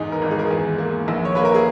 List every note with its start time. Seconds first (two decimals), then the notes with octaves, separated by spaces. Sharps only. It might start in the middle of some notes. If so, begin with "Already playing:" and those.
Already playing: E2 G#2 D#4
0.12 A#4
0.22 G#1
0.31 G#4
0.39 A#4
0.46 E2 G#4
0.78 A#3
1.08 A#1
1.25 C#5
1.35 A#3 B4
1.45 A#4
1.55 G#4